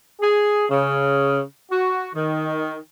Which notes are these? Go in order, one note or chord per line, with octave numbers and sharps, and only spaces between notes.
G#4
C#3
F#4
D#3